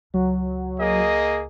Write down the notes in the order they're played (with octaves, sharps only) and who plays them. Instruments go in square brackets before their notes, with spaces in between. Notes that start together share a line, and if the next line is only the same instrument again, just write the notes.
[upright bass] C#2 [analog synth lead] F#3
[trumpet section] A#3 G#4 D#5